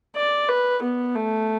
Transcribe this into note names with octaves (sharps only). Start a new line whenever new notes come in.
D5
B4
B3
A3